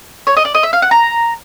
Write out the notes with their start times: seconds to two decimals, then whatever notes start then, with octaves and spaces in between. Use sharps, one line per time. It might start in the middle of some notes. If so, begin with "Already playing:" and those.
0.27 C#5
0.37 D#5
0.45 D5
0.55 D#5
0.63 E5
0.73 F5
0.82 F#5
0.91 A#5